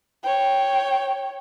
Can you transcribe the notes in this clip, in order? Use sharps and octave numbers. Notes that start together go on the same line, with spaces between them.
C#5 G5